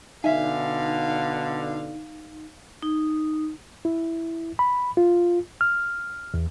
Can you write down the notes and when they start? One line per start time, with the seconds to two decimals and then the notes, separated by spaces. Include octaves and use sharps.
0.24 B2 D3 D#4 E5 F5 G#5
2.83 D#4
3.85 E4
4.59 B5
4.97 F4
5.61 F6
6.34 E2